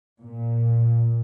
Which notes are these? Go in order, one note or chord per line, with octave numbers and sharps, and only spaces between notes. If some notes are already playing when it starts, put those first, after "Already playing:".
A#2